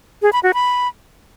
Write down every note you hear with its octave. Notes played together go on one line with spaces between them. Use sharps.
G#4
B5
F#4
B5